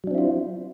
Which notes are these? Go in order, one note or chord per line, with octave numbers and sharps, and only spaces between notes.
F#3 C4 D4 E4 F4